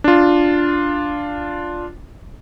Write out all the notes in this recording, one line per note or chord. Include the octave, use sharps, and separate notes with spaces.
D4 F4